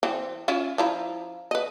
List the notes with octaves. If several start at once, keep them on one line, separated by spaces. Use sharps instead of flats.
E3 C4
C#4 E4 F4
F3 E4 A#5
B4 D#5